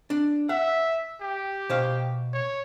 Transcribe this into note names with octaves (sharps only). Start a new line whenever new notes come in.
D4
E5 F#5
G4
B2 C5 F5
C#5